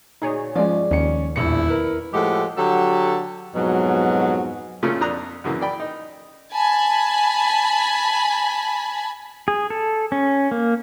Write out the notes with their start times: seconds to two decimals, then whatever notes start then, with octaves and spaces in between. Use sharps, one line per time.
0.22 D2 A#2 D#4 G#4 C#5
0.55 G2 F3 G#3 C#4 D5
0.91 D#2 C#4 C#7
1.36 E1 A#1 A#2 E4 C#7
1.68 A#4 B4
2.13 A2 F3 G#3 G4 A4 F#5
2.57 D3 F#3 G4 A4
3.54 F2 G#2 B2 F#3
4.83 A#2 C#3 A3 A#3 C#4 F4
5.01 F2 D4 A#5 D#6 F#6
5.44 F#2 C#3 E3 A#3
5.62 D5 G5 B5
5.80 D#4
6.52 G#5 A5 B5
9.48 G#4
9.70 A4
10.12 C#4
10.51 A#3